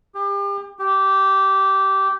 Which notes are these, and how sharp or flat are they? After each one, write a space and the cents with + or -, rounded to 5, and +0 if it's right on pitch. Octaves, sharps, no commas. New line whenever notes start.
G4 +35
G4 -15